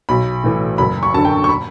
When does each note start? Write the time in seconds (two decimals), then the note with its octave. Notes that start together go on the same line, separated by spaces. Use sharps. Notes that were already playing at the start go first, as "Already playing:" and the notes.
0.09 B1 B5
0.44 A2 E3
0.78 F#1 B5
1.03 C#6
1.14 F#2 D3 A5
1.25 G5
1.44 C#6
1.49 B5